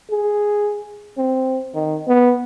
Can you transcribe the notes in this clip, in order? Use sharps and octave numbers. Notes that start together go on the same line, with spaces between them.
G#4
C4
D#3
B3